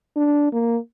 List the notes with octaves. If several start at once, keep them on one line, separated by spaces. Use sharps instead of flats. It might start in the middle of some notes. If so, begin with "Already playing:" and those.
D4
A#3